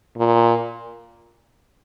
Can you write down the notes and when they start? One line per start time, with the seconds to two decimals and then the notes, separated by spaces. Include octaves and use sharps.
0.17 A#2